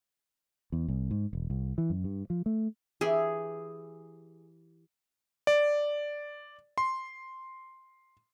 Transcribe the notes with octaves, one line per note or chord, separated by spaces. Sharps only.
E2
C2
G#2
E1
C2
E3
F#2
G2
F3
A3
E3 G4 G#4 E5
D5
C6